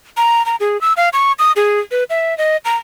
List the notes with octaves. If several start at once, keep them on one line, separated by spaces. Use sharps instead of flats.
A#5
A#5
G#4
E6
F5
C#6
D#6
G#4
B4
E5
D#5
A#5